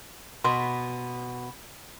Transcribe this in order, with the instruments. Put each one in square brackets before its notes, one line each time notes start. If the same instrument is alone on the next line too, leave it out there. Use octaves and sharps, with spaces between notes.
[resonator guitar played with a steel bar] B2 B3 [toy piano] C6